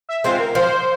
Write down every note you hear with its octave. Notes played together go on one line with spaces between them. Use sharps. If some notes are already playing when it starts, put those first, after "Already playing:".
E5
G#3 C4 F4 C5
A#4
F3 C5